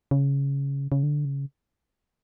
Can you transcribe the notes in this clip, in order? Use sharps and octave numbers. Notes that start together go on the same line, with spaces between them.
C#3
C#3
D3
C#3